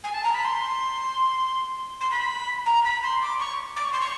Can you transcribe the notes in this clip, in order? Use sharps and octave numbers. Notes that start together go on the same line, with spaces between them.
G#5
A5
A#5
B5
C6
C6
B5
A#5
B5
C6
D6
C#6
D6
C#6
C6
C#6